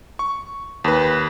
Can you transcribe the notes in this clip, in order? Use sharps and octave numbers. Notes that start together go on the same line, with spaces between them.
C#6
D#2 B4